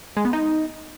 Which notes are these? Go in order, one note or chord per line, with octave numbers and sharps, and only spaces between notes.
G#3
B3
D#4